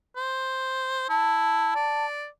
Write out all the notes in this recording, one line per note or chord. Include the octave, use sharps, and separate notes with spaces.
C5
E4 A5
D5